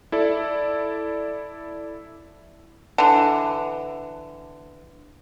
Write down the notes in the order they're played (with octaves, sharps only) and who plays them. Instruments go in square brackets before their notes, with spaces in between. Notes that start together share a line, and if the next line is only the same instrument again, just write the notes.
[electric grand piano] E4 A4 D5
[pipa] D3 E3